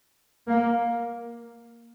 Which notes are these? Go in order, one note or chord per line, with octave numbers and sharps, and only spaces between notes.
A#3